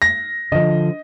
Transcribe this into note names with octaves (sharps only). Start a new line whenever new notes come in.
A#6
D3 F3 D#5